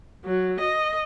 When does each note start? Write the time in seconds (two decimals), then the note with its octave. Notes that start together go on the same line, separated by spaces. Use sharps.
0.25 F#3
0.60 D#5